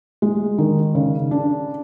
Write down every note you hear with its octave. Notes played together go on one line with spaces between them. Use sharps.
G#3
D#3
C#3
D4